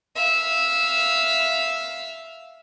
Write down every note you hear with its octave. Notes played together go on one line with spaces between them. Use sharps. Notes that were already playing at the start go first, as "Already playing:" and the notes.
E5 F5